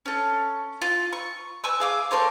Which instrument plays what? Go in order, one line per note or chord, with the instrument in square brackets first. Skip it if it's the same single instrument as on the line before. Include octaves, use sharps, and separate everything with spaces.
[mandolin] C#4 A4
F4
C#6
B4 G#5 C#6 E6
G#4 F5 D6
A#3 A4 C5 C#5